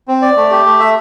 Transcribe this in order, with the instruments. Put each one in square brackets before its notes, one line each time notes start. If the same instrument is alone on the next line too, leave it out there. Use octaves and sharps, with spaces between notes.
[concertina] C4
D5
A3
G4
A3
E5